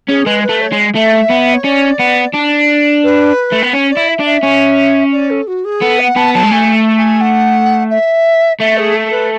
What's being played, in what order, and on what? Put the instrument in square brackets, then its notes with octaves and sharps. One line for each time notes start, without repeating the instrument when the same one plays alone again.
[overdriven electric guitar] C#4 [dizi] G#4
[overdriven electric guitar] G#3 [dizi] B4
[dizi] B4
[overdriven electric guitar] A3
[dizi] C#5
[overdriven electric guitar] G#3
[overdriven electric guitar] A3 [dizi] E5
[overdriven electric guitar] B3
[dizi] C#5
[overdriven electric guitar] C#4 [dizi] D5
[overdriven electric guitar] B3
D4
[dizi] B4
[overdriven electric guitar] A3
B3
[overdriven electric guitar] C#4 [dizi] C#5
[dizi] D5
[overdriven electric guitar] E4
[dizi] E5
[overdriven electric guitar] D4
[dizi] E5
[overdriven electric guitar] C#4
[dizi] D5
A4
F#4
G#4
[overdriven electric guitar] B3 [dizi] A4
[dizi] F#5
[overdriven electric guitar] B3 [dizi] A5
[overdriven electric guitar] F#3 [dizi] A5
[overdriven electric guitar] G#3
[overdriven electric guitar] A3 [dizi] G#5
[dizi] G#5
F#5
E5
[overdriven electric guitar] A3 [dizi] E5
[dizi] G#4
A4
B4